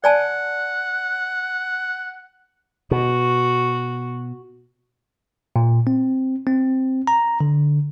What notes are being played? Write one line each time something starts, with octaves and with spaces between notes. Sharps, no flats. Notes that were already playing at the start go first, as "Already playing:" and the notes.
D5 F#5 G#5 A5
B2 F#4
A#2
C4
C4
A#5
D3